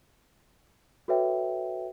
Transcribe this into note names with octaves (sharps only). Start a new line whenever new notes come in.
F#4 A4 B4 C#5 E5 G5